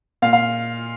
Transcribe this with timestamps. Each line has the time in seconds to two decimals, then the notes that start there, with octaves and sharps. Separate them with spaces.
0.22 A#2 F5
0.33 F5